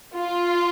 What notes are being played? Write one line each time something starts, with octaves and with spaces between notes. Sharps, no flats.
F4